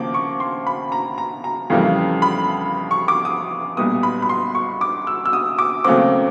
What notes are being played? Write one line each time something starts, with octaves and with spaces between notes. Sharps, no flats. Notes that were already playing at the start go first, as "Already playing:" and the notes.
Already playing: D#2 C#3 F3 A#3 D6
C#6
C6
B5
A#5
A#5
A#5
F2 C#3 E3 G3 A#3
B5
C#6
D6
D#6
B1 A#2 G3 B3 D#6
B5
B5
C6
C#6
D6
E6
E6
D#6
D6
D#2 C#3 F#3 A3 C4 D6